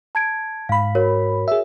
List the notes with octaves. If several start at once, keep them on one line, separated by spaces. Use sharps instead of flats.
A5 G#6 D7
G#2 F5 B5
F#4 A#4 C#5
G#4 E5